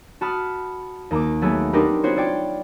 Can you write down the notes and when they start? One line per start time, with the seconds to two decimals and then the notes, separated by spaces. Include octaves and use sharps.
0.21 F#4 A5 B5 D#6 F6
1.11 D#2 A#5 D6
1.42 F#3 A3 B3 G#4
1.73 C4 D4 D#4 G4 A#4 B4
2.03 B3 C4 F4 F#4 C5 C#5
2.16 F4 C#5 D5 G5